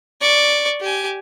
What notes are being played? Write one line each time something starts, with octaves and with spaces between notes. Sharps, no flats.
D5 C#6
G4 G#5